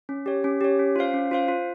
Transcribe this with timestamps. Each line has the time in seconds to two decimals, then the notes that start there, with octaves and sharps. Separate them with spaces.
0.09 C#4
0.26 G4 C#5
0.44 C#4
0.61 G4 C#5
0.79 C#4
0.96 F4 C5 F5
1.14 C#4
1.31 F4 C5 F5
1.48 F4